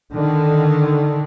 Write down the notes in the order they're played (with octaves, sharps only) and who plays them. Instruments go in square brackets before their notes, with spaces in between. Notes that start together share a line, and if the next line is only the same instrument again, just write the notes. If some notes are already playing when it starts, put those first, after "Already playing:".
[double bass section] D3 D#3